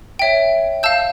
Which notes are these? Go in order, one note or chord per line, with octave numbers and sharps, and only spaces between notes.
C#5 E5 G5
F5 A5 E6 G6